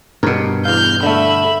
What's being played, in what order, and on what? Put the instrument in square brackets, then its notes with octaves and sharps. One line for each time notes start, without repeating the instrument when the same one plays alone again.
[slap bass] G2 B2 [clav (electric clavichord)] A#4
[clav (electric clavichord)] E2 F5 [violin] F6 G6
[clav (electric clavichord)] D3 A3 [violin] E5 B5